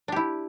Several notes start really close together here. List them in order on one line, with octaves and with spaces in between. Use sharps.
D4 G4 E4